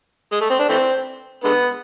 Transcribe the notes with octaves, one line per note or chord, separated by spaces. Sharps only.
G#3
A3
C4
D4
E3 A3 C4
D3 G#3 B3